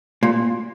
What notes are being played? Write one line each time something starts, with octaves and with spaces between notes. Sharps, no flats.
A#2